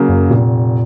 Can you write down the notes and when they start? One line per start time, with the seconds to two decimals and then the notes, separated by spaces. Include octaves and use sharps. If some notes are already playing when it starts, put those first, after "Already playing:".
Already playing: C#3 F#3 A#3
0.09 F#2
0.30 F1 A#2